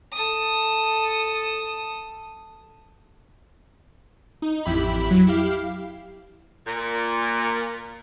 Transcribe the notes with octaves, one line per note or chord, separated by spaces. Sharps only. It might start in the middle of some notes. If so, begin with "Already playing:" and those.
A4 D#6
D#4
A1 F2 E4 G4 B5
F#3
E4 G4 F5
A#2